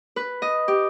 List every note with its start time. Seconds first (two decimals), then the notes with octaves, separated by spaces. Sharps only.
0.16 B4
0.42 D#5
0.68 G4